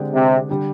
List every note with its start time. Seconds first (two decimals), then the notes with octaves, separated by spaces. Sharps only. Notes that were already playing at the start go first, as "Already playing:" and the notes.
Already playing: D3 G#3 C4 G4 D5
0.13 C3
0.49 D3 G3 D4 G4